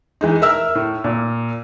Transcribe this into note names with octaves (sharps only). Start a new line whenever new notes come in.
E3 G#3 D#4
A#4 E5 E6 F6
A2
A#2